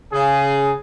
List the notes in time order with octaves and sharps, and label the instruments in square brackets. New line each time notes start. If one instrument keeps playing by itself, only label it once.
[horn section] C#3 G#4